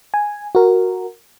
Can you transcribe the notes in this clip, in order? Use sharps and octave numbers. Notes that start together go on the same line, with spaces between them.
G#5
F#4 A#4